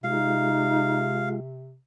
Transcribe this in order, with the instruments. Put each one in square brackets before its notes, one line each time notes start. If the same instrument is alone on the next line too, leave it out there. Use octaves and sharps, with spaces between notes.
[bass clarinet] C3 [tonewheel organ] G#3 F4 [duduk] D#4 [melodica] F5